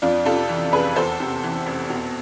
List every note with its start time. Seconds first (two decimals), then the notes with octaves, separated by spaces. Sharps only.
0.02 F2 D4 F4
0.26 C3 F4 A4
0.49 E3
0.72 F1 G#4 B4
0.96 E2 A4 C5
1.20 C3
1.43 E3
1.66 F1
1.90 B2